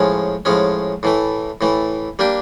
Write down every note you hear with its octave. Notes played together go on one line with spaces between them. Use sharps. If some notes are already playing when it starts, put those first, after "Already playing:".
Already playing: A2 F3 G#3 C#4
A2 F3 G#3 C#4
A2 E3 A3
A2 E3 A3
G3 A#3 D4 G4